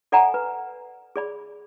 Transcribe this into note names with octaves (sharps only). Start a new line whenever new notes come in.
A4 D5 F#5 G#5 A#5 B5
B4
G#4 D5 B5